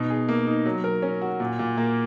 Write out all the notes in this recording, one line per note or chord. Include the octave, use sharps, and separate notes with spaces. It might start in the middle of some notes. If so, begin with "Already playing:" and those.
Already playing: B2 D#4
G#4
A#3
D#4
F#3
A#4
C#4
F#4
A#2
A#2
A#3